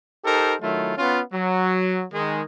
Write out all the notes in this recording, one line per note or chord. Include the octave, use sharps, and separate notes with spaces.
D#4 G4 A4 A#4 C5
D#3 F#3 A3 E4 F4
B3 C#4 F4
F#3
D#3 G#3